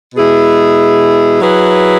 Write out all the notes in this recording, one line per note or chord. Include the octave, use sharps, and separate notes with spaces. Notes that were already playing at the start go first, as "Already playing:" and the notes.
B2 G#3 E4 G#4
F#3 E4 G#4 B4